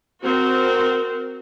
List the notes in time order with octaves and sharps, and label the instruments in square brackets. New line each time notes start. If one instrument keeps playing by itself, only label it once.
[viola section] C4 F#4 A#4 C5